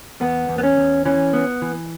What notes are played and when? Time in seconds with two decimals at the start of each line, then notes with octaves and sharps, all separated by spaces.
0.21 E2 B3
0.49 E2
0.58 B3
0.63 C#4
0.77 E2
1.05 E3 C#4
1.33 B3
1.62 E3